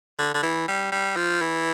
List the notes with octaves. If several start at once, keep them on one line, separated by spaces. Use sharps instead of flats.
D3
D3
E3
G3
G3
F3
E3